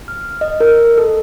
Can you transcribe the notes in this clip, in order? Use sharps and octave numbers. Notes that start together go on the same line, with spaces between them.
F6
D#5
A#4
A4